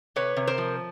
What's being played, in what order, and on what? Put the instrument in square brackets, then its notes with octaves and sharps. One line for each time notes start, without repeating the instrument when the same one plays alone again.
[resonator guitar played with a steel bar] C3 B4 C#5
C3
A#4 C5
F3